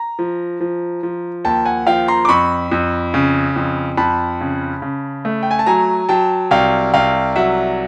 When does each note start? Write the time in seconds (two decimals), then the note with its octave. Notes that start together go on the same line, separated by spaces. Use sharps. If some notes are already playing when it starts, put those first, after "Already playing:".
Already playing: A#5
0.19 F3
0.60 F3
1.03 F3
1.45 D#2 G5 A5
1.65 F#5 G#5
1.87 F3 F5 G5
2.08 A#5 C6
2.25 D6
2.29 F2 B5 C#6
2.71 F2
3.14 C#3
3.56 F2
3.97 F2 A5 B5
4.41 C#3
4.82 C#3
5.25 A3
5.43 G5
5.51 G#5
5.59 A5
5.66 F#3 G#5 A#5
6.09 F#3 G5 A5
6.51 C2 F5 G5
6.93 C2 F5 G5
7.36 F#3 E5 F#5